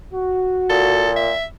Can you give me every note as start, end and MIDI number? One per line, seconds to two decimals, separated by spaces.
0.13 1.09 66
0.70 1.31 46
0.70 1.10 69
1.16 1.44 76